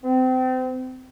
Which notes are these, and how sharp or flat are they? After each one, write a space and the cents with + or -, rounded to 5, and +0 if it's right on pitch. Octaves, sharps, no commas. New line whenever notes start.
C4 -30